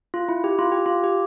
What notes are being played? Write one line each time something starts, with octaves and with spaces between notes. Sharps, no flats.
F4
E4
G4
F4
G4
F4
G4